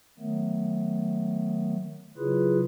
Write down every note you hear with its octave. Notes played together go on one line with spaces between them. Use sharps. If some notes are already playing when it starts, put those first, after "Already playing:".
D#3 F#3 A3 B3
C#3 F#3 E4 F4 G#4 B4